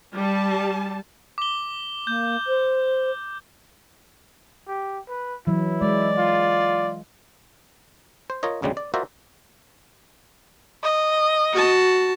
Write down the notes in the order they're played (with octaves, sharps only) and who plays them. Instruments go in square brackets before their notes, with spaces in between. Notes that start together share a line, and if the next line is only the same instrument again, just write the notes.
[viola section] G3 A5
[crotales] D6 G7
[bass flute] A#3 [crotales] G6
[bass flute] C5
[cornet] G4
B4
[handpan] E3 F#3 [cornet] E4
[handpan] G#3 [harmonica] D5
[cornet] F4
[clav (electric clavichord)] C5
F4 A#4 C#5 D#5
A1 D2 C#3 G3 G#3
D5
F4 F#4 A#4 C5 D5 E5
[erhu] D#5
[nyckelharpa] F#4 A5